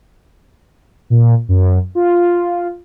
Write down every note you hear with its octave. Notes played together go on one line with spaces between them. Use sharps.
A#2
F#2
F4